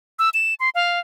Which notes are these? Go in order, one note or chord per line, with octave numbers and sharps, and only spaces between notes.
E6
E7
C6
F5